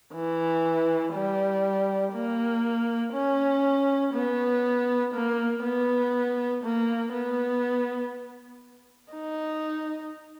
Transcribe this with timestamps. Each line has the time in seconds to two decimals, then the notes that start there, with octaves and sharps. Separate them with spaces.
0.14 E3
1.14 G3
2.14 A#3
3.14 C#4
4.14 B3
5.14 A#3
5.64 B3
6.64 A#3
7.14 B3
9.13 D#4